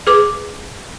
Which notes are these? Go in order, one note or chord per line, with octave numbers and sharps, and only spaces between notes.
G#4 B4 D6